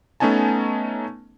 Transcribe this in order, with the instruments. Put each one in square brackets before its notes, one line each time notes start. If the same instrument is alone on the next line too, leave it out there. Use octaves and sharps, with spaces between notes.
[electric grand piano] A3 B3 C#4 D#4 G#5 A5